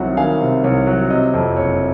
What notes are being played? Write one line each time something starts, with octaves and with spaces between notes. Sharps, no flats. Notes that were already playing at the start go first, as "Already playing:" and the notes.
Already playing: C2 C3 D#3 F#3 F#5
D#3 F5 G#5
C3
C2 C#5
F#3
C3 D#5
F2
F#1 C#5